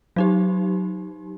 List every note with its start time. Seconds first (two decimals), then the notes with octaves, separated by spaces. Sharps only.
0.16 F#3 D#4 G4